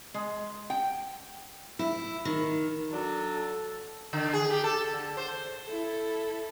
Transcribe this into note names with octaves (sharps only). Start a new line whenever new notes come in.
G#3
G5
E4
D#3
F#3 D4 A4
D3
G#4
G4
A4
D3
C5
E4 A4